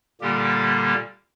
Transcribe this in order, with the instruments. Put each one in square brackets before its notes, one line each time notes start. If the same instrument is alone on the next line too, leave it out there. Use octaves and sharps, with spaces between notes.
[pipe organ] A#2 D3 G3 A#3 G4